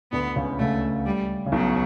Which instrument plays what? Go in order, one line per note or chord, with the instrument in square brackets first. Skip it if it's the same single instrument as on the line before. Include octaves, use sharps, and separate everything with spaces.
[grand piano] D2 D3 [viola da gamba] B3
[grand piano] C#2 C#3
[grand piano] C#2 C#3 [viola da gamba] A3
[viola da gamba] G3
[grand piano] C#3
[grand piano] B1 B2 [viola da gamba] F#3